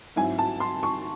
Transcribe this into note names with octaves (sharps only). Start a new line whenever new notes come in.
G#2 F#3 C4 E4 G#5
A5
C6
C#6